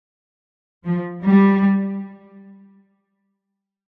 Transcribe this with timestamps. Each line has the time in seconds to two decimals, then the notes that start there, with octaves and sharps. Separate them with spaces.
0.86 F3
1.25 G3